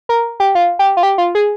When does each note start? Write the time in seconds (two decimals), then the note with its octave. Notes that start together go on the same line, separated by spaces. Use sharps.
0.09 A#4
0.40 G4
0.55 F4
0.79 G4
0.97 F4
1.03 G4
1.18 F4
1.35 G#4